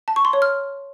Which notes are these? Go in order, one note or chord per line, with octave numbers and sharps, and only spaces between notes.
A5
C#6
C6
C#5
F6